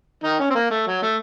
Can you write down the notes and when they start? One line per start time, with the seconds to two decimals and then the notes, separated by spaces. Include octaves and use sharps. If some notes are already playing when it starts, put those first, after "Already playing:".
0.24 D#3 D#4
0.40 C#4
0.50 C4
0.55 A#3
0.71 A3
0.87 F#3
1.02 A3